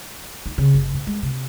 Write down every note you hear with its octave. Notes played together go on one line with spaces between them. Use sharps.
D#4
C#3
F#1
B2
G#3
C3